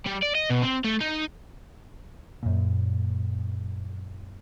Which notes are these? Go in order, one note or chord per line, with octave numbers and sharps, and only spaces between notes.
G3
D5
D#5
B2
C4
A3
D#4
F#2 A#2